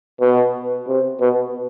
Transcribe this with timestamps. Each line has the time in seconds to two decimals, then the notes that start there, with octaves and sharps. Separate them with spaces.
0.21 B2
0.88 C3
1.21 B2